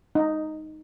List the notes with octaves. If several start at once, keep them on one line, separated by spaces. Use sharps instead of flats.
D#4